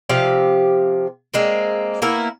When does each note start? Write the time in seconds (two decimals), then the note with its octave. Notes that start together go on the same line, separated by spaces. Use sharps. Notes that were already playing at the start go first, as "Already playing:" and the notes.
0.09 C3 F3 G4 F5
1.34 G#3 A#3 C4
2.02 A#3 B3 E4 A#4